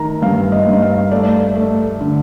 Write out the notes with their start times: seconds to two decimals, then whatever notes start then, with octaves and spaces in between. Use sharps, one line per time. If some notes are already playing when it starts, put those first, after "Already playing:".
Already playing: D#3 A3 A#5
0.22 G2 F5
0.52 D#5
0.67 G2
0.73 D#5
0.82 F5
1.11 A3 D5
1.55 A3
2.00 D3